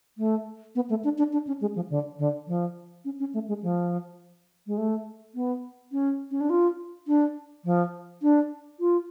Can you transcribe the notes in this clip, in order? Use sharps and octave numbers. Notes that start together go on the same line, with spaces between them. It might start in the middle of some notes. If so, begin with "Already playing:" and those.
A3
B3
A3
D4
D4
D4
C#4
G#3
F3
D3
D3
F3
C#4
C#4
A3
G#3
F3
G#3
A3
B3
C#4
C#4
D4
F4
D4
F3
D4
F4